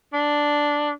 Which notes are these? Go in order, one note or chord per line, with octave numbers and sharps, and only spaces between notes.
D4